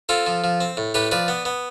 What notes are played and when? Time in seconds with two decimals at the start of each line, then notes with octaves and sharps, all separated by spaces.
0.09 C4 F4 A4
0.27 F3
0.44 F3
0.61 C4
0.77 A2
0.94 A2 G4 B4
1.11 F3 B4 D5
1.28 B3
1.45 B3